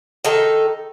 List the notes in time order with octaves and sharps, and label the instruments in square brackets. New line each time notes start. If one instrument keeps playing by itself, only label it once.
[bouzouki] D#3 D#4 A4